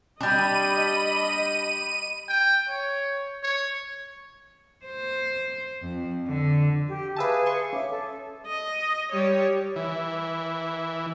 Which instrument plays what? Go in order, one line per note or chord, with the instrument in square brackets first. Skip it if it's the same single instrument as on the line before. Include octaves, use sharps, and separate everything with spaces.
[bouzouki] G3 D4 [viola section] D#5 B5 [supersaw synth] D#7
[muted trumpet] G5
C#5
C#5
[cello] C5
F2
D3
[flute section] G4
[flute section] G#4 F5 G#5 [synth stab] B4 E5 A5
[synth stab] C6 C#6
[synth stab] C#4 [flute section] E5 D6
[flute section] A4
[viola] D#5
G3 C#5
[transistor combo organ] E3